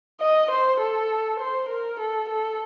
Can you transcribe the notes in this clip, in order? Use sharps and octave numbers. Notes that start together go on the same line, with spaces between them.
D#5
C5
A4
C5
A#4
A4
A4